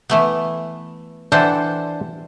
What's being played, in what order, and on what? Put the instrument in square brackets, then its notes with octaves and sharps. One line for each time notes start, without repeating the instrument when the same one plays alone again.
[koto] E3 A3 B3
[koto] E3 A4 C5 [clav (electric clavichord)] D4 F#5 G5